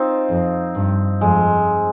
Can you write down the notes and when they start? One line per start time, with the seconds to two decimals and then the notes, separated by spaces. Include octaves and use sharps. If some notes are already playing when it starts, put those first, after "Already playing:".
Already playing: C4 D#4 F4
0.29 F2
0.75 G2
1.21 F2 G#3